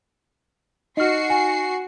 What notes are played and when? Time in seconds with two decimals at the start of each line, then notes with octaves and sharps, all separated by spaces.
0.97 D#4 F#4 D#5 F6 C7 C#7
1.30 G#5